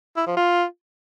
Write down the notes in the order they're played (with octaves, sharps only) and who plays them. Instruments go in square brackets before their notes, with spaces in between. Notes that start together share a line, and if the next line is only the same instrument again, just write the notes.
[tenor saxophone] E4
F3
F4